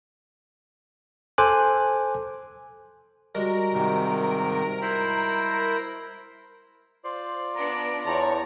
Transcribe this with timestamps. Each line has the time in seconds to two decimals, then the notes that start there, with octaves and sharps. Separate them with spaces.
1.38 A4 C5 G#5 D6 F#6
3.35 G3 G#3 F#4 A#4
3.73 G#2 C3 D#3
4.82 E4 C5 B5
7.04 F4 C5 D5
7.56 B3 D4 A#5 D7
8.06 E2 C#5 A5 A#5